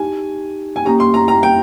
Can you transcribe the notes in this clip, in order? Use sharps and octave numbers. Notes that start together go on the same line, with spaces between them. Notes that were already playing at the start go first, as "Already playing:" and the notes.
Already playing: D#4 G4 G#5
G#5
A#3 C#4 G4 A#5
C6
A#5
A#5
G5